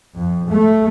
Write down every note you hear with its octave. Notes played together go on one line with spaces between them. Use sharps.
F2
A3